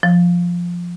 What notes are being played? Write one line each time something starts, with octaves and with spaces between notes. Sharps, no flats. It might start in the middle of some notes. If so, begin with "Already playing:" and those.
F3